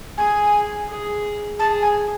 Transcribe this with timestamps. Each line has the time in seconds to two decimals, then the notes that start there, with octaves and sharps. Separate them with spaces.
0.18 G#4 G#5
0.89 G#4
1.59 G#4 A5
1.82 G#5